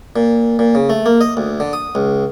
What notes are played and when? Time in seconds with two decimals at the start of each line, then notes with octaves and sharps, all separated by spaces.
0.16 A#2
0.59 A#2
0.75 C#3
0.90 A3
1.06 A#3
1.21 D#5
1.37 D2
1.60 D3
1.73 D#6
1.95 C#2